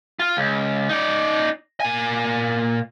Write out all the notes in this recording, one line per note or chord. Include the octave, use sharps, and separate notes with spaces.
F4
C#2
D#4 D5
A#2 G#5